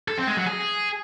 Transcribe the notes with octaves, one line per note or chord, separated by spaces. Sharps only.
A4
C4
G#3
F#3
G#4